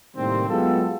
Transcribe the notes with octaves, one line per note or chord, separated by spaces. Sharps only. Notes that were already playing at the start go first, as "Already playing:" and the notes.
A2 C3 D#3 G3 A#3 C4
F#3 G#3 B3 F4 G4 A4